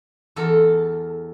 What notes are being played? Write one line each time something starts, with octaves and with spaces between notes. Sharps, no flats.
E2 A4 A#4